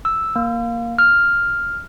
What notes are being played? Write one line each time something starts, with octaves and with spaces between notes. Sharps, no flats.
E6
A#3
F6